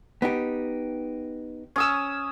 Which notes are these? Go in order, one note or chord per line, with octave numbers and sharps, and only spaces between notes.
B3 D#4 G4
C#4 D#6 E6